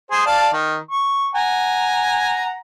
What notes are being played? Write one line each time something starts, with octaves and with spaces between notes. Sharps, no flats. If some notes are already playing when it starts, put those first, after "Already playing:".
G#4 C5
D5 F5 A5
D#3
C#6
F#5 G#5 A#5